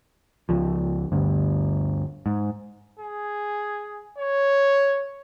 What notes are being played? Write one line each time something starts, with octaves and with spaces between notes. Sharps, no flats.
C#2 F3
G1 D2 G2
G#2
G#4
C#5